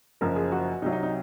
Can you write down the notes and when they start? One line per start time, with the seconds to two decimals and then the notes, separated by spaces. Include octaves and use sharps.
0.21 F#1 F#2 F3 A#4
0.36 G#4
0.52 F#4
0.82 C2 C3 F#3 D#4
0.93 D#4
1.03 D#4